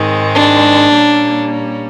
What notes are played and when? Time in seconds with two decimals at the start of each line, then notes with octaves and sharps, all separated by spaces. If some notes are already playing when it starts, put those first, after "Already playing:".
Already playing: G#2 D#3 G#3 C4
0.35 D4
0.93 A#2 G3 A#3 C#4